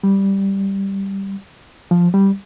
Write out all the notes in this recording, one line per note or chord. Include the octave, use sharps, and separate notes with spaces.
G3
F3
G3